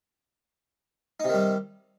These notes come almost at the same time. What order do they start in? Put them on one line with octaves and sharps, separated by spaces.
D#4 C3 D#3 G3